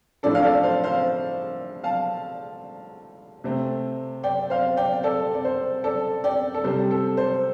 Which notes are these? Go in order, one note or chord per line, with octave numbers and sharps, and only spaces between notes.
A2 F3 D4 A4 D5
F5
A4 D5
C5 F5
C5 F5
F5 A5
C3 A3 C4
D5 G5
C5 F5
D5 G5
A4 D5
D5
C5
A4 D5
D5 G5
A4
C3 G3 C4 C5
A4
C5